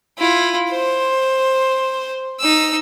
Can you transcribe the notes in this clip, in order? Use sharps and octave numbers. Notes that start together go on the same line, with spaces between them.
E4 F4
C5
D#4 E6